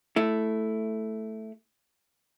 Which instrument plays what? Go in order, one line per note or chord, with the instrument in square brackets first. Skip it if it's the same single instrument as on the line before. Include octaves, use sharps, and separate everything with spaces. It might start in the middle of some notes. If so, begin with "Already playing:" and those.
[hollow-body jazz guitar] A3 E4